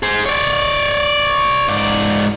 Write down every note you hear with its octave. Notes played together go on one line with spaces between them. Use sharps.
G#4 C5
C#5 D5
G#2 D5